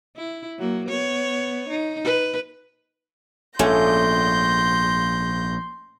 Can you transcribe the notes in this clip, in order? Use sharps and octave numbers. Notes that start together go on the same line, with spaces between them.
E4
F#3 A#3
B3 C#5
D#4
B4
A#1 G#2 A3 C#4 C6 G6 A#6